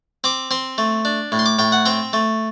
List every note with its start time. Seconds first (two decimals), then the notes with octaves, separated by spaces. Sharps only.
0.24 C4 D6
0.51 C4 C6
0.78 A3
1.05 D4
1.32 A2
1.39 C6
1.46 D6
1.59 A2 G5
1.72 F#5
1.86 C4 G5
2.13 A3